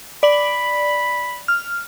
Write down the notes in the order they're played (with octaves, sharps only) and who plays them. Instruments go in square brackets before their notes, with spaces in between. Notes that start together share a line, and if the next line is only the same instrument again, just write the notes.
[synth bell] D5 F#7 [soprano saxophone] B5
[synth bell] F6